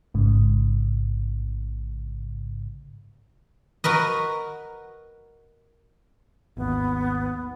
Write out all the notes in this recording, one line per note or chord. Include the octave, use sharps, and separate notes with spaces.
A1 G#2 C#3
F#4 A#4 B4 D#5
G#1 D#2 B3